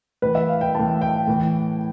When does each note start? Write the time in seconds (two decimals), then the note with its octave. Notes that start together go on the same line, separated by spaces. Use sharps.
0.22 A2 E3 B4
0.35 E5
0.48 F5
0.61 G5
0.75 A2 E3 A5
1.01 G5
1.27 A2 E3